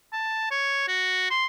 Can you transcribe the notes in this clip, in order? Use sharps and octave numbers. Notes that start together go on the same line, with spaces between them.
A5
C#5
F#4
C6